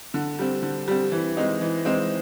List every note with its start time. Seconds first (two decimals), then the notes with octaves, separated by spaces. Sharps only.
0.14 D3
0.39 G3 C4
0.62 D3
0.88 G3 C4
1.12 E3
1.37 G#3 C4 D#4
1.61 E3
1.85 G#3 C4 D#4